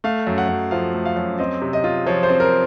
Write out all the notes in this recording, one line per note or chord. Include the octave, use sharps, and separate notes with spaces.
A3 F5
F#2
F#5
F#2
F3 F5
A3
F5
F#2
C4 D#5
C3
D#5
F4
F3 C#5
C5
C4
A#4